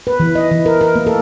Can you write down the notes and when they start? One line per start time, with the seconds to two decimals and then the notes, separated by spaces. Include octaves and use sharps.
0.07 B4
0.20 E3
0.35 D#5
0.51 E3
0.66 A#4
0.81 A#4
0.95 A#3
1.06 A4